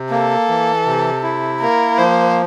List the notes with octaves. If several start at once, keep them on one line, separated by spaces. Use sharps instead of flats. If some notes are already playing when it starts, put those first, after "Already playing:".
Already playing: C3
A#3 A4
E3
C3
E4
A#3 A#4
F3 C5